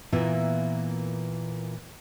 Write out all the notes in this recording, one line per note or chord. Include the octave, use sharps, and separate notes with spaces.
A#2 E3 A#3 B3 F4 E5